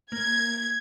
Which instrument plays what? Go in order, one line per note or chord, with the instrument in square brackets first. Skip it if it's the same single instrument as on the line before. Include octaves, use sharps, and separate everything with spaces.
[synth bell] A#3 [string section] G#6